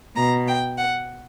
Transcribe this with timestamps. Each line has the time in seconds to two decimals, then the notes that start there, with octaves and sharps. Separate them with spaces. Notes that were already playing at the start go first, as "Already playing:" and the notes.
0.16 B2 A#5
0.48 G5
0.78 F#5